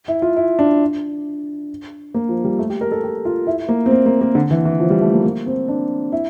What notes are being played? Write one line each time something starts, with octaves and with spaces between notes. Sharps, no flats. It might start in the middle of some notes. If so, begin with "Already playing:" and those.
E4
F4
E4
D4
A#3
F3
G3
A3
G4
A#4
A4
G4
F4
E4
A#3
C4
A#3
A#3
A#3
D3
E3
E3
F3
G3
A3
A#3
A#3
C4
D4
E4